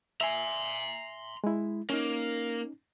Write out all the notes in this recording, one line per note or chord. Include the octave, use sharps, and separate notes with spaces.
E5 G#5 A#5 C6
G#3 E4
A#3 C#4 D#4